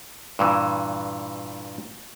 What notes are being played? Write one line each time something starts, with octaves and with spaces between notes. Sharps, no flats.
G2 A#2 E3